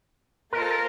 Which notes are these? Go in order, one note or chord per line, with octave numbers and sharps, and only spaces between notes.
A#3 F4 A#4 C5 D#5 A5
A4
A#4